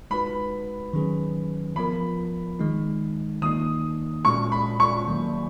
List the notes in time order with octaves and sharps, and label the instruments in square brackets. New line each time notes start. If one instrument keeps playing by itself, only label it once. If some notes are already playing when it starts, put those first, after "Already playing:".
[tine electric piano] G#3 D#4 F#4 B4 [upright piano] B5
[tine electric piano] D#3 F#3 C#4 G#4 B4
[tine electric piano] F3 B3 F4 A#4 [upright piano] B5
[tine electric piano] D#3 G#3 D#4
[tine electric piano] D#3 A#3 D#4 [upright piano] D#6
[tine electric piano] A#2 G#3 C#4 F#4 [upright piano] C#6
[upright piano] B5
C#6
[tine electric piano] D#3 F#3 A#3